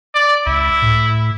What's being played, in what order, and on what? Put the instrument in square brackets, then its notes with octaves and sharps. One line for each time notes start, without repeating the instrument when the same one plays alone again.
[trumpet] D5
[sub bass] C#2 [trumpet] E4
[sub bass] A2